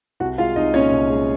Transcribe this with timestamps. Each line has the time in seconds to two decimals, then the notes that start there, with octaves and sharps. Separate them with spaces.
0.20 C2 F#4 F#5
0.38 G#3 F4 F5
0.56 C2 D#4 D#5
0.74 A#2 C#4 C#5
0.92 C2
1.09 G#3